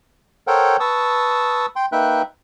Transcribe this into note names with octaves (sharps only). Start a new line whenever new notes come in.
A4 A#4 C5 C#5 F#5 G5
B4 A5 C#6 D#6 E6
G5 C6
A#3 D#4 B4 E5 G5 F#6